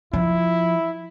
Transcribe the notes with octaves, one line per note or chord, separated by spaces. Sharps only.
F3 E4